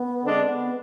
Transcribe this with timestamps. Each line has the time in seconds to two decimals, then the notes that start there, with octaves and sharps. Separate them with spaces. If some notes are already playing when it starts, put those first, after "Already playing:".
Already playing: B3
0.25 D3 G#3 C4 D4
0.48 B3